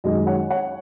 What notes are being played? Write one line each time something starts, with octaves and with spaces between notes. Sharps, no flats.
F#2 D#3 G#3 D#5
C#5 F#5
C#5 F#5